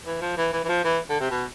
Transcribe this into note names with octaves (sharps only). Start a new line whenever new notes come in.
E3
F3
E3
E3
E3
F3
E3
D3
C3
B2